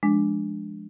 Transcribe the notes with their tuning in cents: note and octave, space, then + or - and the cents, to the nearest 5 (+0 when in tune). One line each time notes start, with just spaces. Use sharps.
F3 -15 G#3 +0 D4 +0